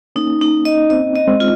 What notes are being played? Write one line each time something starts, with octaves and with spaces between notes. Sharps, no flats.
A#3 C#4 D#4
D#4
D#5
C4 D#4 D#5
D#5
G#3 C4
F4